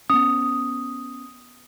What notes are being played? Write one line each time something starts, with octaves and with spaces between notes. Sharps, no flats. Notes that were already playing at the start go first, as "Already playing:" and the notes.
B3 C#4 D#6